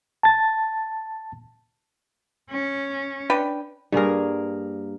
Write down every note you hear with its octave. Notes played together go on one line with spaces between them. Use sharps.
A5 A6
C#4
D4 B4 G5
G2 A#3 G#4 A#4